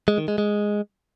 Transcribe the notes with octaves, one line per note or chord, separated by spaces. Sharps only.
G#3
D#3
G#3
G#3